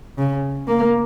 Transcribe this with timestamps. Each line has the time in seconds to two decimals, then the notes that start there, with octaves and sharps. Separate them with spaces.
0.18 C#3
0.68 A#3